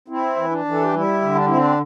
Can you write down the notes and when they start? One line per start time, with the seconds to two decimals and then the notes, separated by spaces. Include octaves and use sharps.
0.08 C4 E4
0.36 E3
0.51 D4
0.65 E3
0.72 A4
0.82 G4
0.93 G3 E4
1.21 D3
1.35 D4
1.47 C4 E4
1.57 D4